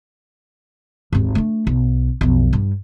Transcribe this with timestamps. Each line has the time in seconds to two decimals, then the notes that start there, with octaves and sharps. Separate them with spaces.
1.13 G#1 D#2
1.35 A3 D4
1.67 B1
2.21 B1 F2
2.53 G2 G3